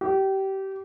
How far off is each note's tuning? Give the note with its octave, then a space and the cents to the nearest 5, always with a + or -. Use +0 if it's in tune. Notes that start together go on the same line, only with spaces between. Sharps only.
G4 -25